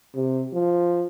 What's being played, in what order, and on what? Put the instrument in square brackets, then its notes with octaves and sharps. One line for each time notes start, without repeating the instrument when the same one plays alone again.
[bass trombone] C3
F3